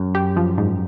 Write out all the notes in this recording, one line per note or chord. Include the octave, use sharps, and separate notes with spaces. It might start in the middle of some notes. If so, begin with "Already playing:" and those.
Already playing: F#2
G4
F3
G#2